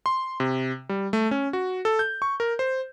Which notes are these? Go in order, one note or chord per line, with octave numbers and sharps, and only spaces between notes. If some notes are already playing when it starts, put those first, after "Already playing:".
C6
C3
G3
A3
C#4
F#4
A4
G6
C#6
A#4
C5